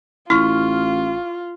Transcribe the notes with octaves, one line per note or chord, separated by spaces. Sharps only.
A1 E4 F4 C#6 F6